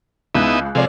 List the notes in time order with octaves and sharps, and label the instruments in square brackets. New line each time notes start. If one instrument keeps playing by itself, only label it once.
[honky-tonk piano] C#2 C#3 F#6 [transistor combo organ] B3 D#4 E4
[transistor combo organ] C3 F3 G#3 [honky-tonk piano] A4 C#5 D5